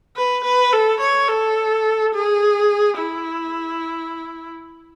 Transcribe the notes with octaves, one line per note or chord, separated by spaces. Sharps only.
B4
B4
A4
C#5
A4
G#4
E4